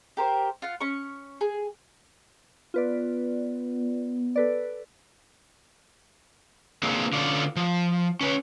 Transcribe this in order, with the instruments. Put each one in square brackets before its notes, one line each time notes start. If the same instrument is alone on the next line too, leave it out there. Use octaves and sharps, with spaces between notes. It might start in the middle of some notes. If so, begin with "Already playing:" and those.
[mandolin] G4 A#4 C5
F4 F#5
C#4 C#6
G#4
[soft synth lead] B3 [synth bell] F4 B4 D5
[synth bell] A4 B4 D5
[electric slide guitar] A#3 C4 D4 F4 G#4
D3 C#4 F4 D5
F3
C#4 B4 C#5